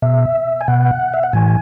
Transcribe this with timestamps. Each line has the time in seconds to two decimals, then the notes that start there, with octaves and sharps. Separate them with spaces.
0.02 B2 E5
0.61 G#5
0.68 B2 F#5
1.14 E5
1.23 F#5
1.33 A2 E3 G#5